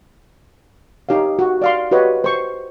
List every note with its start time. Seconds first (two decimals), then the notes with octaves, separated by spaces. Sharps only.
1.09 D#4 G4 C#5 F5
1.39 F#4
1.62 D5 F5 C6
1.91 F#4 G4 B4 C#5 D#5
2.24 C5 C#6